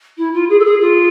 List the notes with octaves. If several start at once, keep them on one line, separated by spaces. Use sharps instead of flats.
E4
F4
G#4
A4
G#4
F4